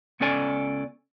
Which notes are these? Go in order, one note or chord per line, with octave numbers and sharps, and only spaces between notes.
C#2 B3 C#4 A4 D5 G#5